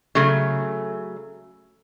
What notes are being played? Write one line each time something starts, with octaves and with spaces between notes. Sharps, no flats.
C#3 F#3 A3